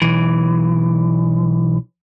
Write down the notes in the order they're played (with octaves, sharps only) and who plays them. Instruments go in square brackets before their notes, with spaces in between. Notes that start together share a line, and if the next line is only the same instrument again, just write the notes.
[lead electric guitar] B1 E3